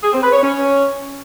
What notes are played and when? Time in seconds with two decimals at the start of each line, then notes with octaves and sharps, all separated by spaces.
0.03 G#4
0.13 C4
0.23 B4
0.33 C#5
0.43 C#4